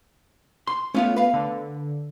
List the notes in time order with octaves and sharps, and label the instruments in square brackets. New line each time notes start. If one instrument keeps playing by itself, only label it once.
[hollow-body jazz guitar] C6
[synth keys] A3 B3 [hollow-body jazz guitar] C#4 F4 C#5
[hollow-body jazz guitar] B4 F5
[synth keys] D3